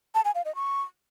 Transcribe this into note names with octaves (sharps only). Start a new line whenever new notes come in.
A5
G#5
F5
D#5
C#6